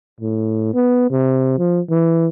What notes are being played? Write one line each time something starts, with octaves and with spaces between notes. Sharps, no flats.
A2
B3
C3
F3
E3